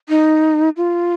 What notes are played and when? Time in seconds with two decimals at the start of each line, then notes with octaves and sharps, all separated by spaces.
0.09 D#4
0.77 F4